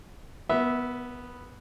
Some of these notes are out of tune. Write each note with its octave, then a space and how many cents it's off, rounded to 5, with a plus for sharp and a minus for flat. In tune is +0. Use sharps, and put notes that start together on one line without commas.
B3 +0 A#4 +35 E5 -15